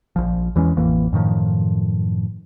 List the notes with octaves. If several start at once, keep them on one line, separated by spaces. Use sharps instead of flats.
A#1 F3
E2 E3 G#3 C#4
A1 F2 E3 A#3
F#2 A2 D#3 F3